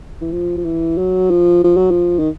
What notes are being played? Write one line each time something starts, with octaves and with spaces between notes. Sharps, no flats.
E3
F3
F3
E3
F#3
F3
F3
F#3
F3
D#3